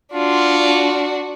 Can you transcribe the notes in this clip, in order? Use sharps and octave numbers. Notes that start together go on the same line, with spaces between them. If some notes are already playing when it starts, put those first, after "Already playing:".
D4 F4 F#4